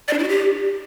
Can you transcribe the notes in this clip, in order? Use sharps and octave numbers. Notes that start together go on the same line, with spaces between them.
D5
D4
E4
F#4
G4